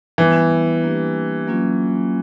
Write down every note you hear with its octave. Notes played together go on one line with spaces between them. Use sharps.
E3 G3 B3 E4
G3 A#3 D4 G4
F#3 A#3 C#4 F4